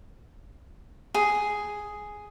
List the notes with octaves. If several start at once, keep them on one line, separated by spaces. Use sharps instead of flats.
G#4